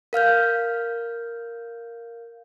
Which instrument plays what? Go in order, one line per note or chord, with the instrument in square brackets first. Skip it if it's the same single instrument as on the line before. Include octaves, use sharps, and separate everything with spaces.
[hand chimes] A#4 F5 F6 G6